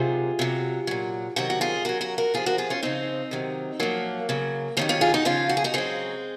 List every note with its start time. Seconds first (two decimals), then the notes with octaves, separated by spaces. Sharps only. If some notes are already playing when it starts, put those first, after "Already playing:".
Already playing: C3 D#3 F#3 F4 G#4
0.39 C3 F#3
0.87 A#2 F#3
1.36 C3 D#3 F#3 F#4 A#4
1.50 F#4
1.61 F4 G#4
1.85 C#3 F#3 F#4 A#4
2.01 F#4 A#4
2.18 F#4 A#4
2.34 C3 F3 F4 G#4
2.46 F#4 A#4
2.58 F4 G#4
2.70 C#4 F4
2.82 C#3 F3 C4 D#4
3.31 C3 D#3 F#3
3.79 A#2 F3 F#3 A#3
4.29 C#3 F#3
4.77 C3 D#3 F#3 A#3 C#4
4.89 C#4 F4
5.01 F4 G#4
5.14 D#4 F#4
5.25 C#3 F3 C#4 F4
5.49 F#4
5.57 G#4
5.64 D#4 F#4
5.74 C#3 F#3 G#3 C4